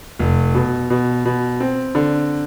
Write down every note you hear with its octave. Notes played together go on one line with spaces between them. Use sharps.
F1
B2
B2
B2
C4
D3